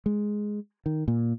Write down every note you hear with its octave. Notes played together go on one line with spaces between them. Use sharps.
G#3
D#3
A#2